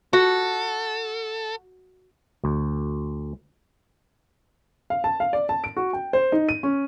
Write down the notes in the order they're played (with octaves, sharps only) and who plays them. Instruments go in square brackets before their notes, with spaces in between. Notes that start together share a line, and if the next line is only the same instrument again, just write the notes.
[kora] F#4 [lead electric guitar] A4
[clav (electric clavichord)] D2
[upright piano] F5
A5
F5
D5
A5
D7
F#4
G5
C5
D#4
D#7
C#4